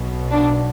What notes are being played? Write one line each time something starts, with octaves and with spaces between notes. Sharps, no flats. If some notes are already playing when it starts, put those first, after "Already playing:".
Already playing: B1 B2
D4